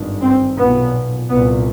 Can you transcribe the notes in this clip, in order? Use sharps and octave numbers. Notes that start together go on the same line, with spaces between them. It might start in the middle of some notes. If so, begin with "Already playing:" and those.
Already playing: G#1 G2
C4
B1 A#2 B3
C2 A#2 B3